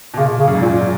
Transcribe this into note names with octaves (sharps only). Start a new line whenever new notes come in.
B2
A#2 C#3
C#3
F#2
G#2
F#2 A#2